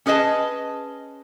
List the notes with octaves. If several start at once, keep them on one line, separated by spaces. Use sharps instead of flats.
C#4 G#4 B4 D#5 A5